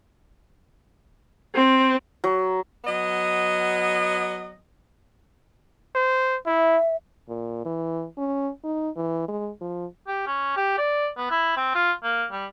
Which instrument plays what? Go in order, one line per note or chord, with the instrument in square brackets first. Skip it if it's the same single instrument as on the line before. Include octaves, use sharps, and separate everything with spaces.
[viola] C4
[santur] F#3
[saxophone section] F#3 B3 D#5
[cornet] C5
[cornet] E4 [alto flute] E5
[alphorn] A#2
E3
C#4
D#4
E3
G#3
F3
[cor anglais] G4
C#4
G4
D5
B3
E4
C4
F4
A#3
G3